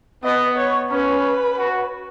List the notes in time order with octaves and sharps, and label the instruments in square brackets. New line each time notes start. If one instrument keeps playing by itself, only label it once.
[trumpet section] B3 [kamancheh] D#5
[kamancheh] C#5
[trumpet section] C#4 [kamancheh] B4
[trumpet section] F#4